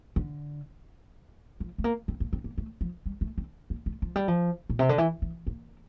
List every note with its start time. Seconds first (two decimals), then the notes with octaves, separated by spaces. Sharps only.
0.16 D3
1.60 F3
1.78 A3
1.84 A#3
2.08 C4
2.20 A#3
2.33 C4
2.44 A#3
2.58 A3
2.81 F3
3.06 G3
3.21 A3
3.38 C4
3.70 A#3
3.86 A3
4.02 F3
4.16 G3
4.28 F3
4.70 A#2
4.79 C3
4.89 D3
4.98 E3
5.22 E3
5.47 A#3